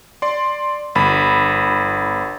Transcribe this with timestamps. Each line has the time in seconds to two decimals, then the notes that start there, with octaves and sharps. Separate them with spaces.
0.22 D5 C6
0.95 G1 B5